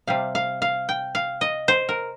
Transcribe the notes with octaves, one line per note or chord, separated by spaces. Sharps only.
C3 G3 F5
F5
F5
G5
F5
D#5
C5
A#4